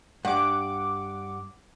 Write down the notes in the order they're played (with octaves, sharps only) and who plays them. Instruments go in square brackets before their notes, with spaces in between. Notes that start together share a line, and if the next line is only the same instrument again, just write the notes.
[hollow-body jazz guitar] G2 [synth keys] F#5 D6